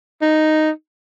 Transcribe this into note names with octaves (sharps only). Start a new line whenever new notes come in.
D#4